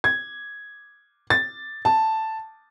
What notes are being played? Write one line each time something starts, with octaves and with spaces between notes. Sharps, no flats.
G#6
A6
A5